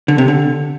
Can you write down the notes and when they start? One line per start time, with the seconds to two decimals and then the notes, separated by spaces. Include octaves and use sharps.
0.08 D3
0.18 C3
0.28 D3